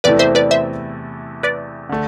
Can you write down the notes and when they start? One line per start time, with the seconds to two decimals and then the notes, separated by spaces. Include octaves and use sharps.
0.04 E2 C3 E3 A3 E4 B4 D5
0.19 C5 E5
0.35 B4 D5
0.51 C5 E5
1.43 B4 D5
1.89 D3 A3